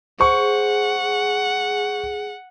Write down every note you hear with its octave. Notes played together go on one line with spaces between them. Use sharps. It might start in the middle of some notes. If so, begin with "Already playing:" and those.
G#4 C5 F#5 C#6